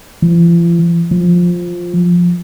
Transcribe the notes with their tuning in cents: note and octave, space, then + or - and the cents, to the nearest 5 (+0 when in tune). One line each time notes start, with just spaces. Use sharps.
F3 -45
F3 +5